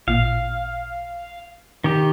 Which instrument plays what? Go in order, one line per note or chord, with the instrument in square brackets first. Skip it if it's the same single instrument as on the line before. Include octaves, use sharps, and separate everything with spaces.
[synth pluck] A1 A#2 [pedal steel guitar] F5
[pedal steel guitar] D#3 G4